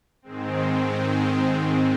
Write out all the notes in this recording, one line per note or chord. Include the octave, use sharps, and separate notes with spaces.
G#2 D#3 G#3 C4